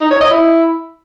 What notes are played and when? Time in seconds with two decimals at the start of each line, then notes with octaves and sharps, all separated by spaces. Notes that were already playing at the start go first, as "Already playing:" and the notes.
0.01 D#4
0.11 C#5
0.21 D#5
0.31 E4